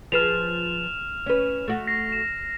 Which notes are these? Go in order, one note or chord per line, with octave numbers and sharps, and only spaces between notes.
F3 G#4 B4 F6 E7 F7
C#4 B4
A3 F#4
A#6 C7
E7